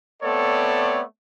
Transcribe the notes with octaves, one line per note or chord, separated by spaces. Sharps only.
A3 B3 C4 A4 C#5 D5